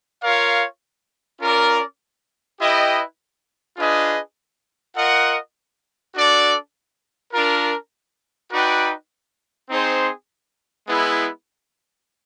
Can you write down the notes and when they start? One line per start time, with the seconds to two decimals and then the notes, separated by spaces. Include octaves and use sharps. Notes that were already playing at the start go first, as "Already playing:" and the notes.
0.22 F4 A#4 C#5 F5
1.40 C#4 F4 A#4 D5
2.59 E4 G4 B4 D#5 G5
3.77 D4 F4 G#4 B4 D#5
4.95 F4 A#4 D#5 F#5
6.14 D4 F#4 A4 D5
7.32 D4 F4 A#4
8.51 D#4 F#4 B4 D5 G5
9.69 C4 D#4 G#4 C5
10.86 G#3 B3 E4 G#4